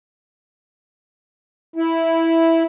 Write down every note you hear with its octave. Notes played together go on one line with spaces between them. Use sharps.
E4